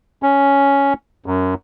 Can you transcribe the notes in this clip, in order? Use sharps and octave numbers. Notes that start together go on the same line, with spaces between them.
C#4
F#2